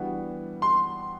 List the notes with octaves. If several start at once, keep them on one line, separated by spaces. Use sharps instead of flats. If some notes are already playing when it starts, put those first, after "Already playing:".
Already playing: E3 G3 B3 D4 F#4
C6